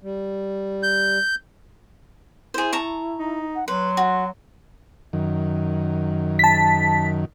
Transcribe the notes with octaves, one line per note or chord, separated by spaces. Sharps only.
G3
G6
E4 G#4 C5
A5 A#5 C#6
D#4
F#5
F#3 B4 C6
F#4
F#2 D#3
A5 B6